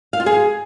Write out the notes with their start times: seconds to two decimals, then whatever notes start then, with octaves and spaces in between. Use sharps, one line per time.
0.13 F5
0.20 F4
0.26 G#4